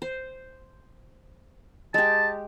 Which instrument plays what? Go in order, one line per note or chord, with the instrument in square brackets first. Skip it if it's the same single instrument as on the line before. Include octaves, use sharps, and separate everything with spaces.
[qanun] C5
[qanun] G#3 G4 [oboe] A5